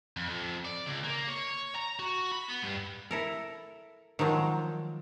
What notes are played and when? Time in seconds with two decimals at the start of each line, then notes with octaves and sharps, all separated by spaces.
0.17 F2
0.29 F2
0.65 D5
0.86 C#2
1.04 A#3
1.28 C#5
1.75 A#5
1.99 F#4
2.32 B5
2.48 B3
2.63 G2
3.11 E4 A4 A#4
4.19 D#3 F3 F#3 G#3 F4